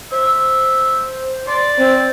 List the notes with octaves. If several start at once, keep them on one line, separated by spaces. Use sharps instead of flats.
C5 E5
D5 C6
C4 C5